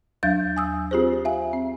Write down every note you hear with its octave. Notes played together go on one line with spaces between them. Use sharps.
D#2 F#3 D4 F5 G6 A6
G#5 D#6 E6
C4 F4 G4 G#4 C5
E5 F5 G#5
C4